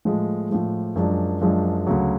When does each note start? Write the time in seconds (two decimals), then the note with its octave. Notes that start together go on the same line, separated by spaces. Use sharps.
0.05 A2 F3 G#3
0.50 A2 F3 G#3
0.96 F#2 F3 G#3 D4
1.41 F#2 F3 G#3 D4
1.87 D2 C#3 F#3